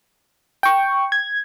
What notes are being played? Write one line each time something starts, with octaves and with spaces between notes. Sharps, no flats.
G5 C#6
G#6